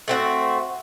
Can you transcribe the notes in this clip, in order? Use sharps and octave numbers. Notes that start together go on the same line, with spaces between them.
A3 C4 F#4